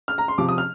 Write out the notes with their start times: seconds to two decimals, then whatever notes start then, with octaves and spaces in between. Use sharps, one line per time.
0.08 F6
0.18 A#5
0.28 C6
0.38 C3 F3 D6
0.49 D#6
0.58 F6